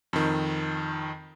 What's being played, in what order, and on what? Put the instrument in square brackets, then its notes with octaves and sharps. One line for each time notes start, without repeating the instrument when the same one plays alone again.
[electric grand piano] F2 D#3